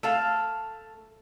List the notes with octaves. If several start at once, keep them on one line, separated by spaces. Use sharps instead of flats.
A3 A4 F5